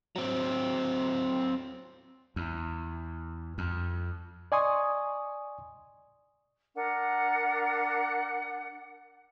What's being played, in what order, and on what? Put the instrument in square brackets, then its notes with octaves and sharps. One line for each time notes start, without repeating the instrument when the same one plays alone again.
[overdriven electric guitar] F#3 C4
[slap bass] E2
F2
[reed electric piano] D5 D#5 G#5 C6 C#6 D#6
[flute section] D4 A#4 F#5